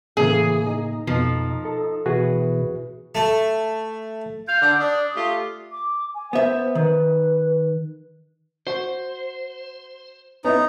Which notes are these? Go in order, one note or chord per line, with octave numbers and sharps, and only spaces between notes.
A2 C#3 E3 A#3 G#4
D#4
F2 B2 F3
A4
B2 E3 F#4 G#4 B4
A3
F5 G6
D3
D4 D#6
A3 F4 G4
D6
G#5
B3 C5 E5
D#3 B4
F#4 C5
B3 C#4 D#4 E4